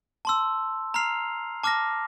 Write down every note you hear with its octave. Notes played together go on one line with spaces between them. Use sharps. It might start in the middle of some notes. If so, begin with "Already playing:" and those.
A5 C6 E6
A#5 F6 C7 F7
A5 D6 F6 A#6